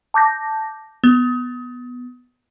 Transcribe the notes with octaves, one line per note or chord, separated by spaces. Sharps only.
A5 D6 G6 A#6
B3